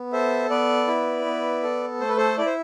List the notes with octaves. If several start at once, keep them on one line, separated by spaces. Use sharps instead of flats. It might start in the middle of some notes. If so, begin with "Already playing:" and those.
Already playing: B3
A4 C5 E5
B3 B4 D5
E4
B3
A4
A3 C5
B4
A4 C5
E4 D5
C5